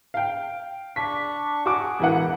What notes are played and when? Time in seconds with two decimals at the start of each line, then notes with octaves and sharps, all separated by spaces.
0.14 F5 G5
0.96 D4 C#6 B6
1.66 F#4 G#4 D6
2.00 E1 E3 F#5